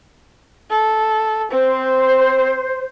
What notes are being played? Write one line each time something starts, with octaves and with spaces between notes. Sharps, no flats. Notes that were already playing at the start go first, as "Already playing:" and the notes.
A4
C4 C5